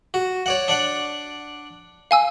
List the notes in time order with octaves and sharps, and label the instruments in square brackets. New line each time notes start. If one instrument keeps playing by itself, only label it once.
[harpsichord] F#4
C#5 D5 F#5
D4 D5 F#5
[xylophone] F5 G#5 E6